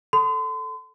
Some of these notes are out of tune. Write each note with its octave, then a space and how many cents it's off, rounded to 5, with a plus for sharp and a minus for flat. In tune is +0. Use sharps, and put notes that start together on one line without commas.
A4 +0 C6 -40